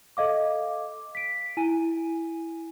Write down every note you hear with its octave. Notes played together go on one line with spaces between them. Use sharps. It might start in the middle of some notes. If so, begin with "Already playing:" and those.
A4 D#5 F5 D6
B6 D7
E4 G#5 D#7